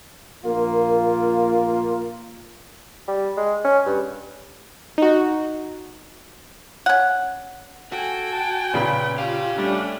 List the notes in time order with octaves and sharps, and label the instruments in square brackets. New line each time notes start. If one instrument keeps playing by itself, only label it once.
[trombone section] A#1 A#3 F4 [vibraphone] A#4
[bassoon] G3
G#3
C#4
G2
[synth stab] D#4 F#4
[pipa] C#4 F#5
[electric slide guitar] F#4 [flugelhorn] A4 [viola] G5 G#5
[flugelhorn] A5
[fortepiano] A#2 C#3 B5 [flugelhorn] B4
[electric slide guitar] C#4 F5 [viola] F4 [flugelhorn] G4
[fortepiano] G3 [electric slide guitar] A3 [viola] C#4 D4